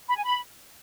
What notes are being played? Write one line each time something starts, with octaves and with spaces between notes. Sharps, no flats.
B5
G#5
B5